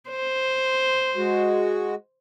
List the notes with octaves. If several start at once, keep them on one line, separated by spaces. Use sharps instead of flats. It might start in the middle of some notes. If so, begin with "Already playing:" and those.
C5
G#3 F#4